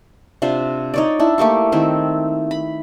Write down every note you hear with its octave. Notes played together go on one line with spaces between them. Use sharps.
C3 D4 F4 C5
D#4 C#5 D5
D4 E4
A3 A#3 G4 C#6
D#3 C4 E4
B5